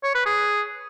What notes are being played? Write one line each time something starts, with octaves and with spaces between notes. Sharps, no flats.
C#5
B4
G#4